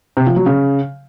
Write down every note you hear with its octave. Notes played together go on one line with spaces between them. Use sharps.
C3
F3
F#3
C#3